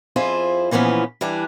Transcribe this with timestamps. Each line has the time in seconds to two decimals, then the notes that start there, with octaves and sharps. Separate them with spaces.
0.16 F2 E4 F4 G#4 C5
0.71 A#2 E3 F3 B3 C#4
1.21 E3 G3 D4